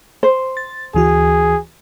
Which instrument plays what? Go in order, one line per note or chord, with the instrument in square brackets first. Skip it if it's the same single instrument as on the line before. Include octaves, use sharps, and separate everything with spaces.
[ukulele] C5
[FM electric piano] A6
[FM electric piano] D2 E3 F#4 [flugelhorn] G#4